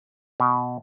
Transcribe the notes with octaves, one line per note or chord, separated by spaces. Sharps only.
B2